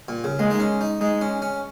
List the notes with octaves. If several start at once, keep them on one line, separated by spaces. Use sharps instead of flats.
A#2
C#3
G#3 A#3
D#4
C#4
D#4
G#3 D#4
C#4
C#4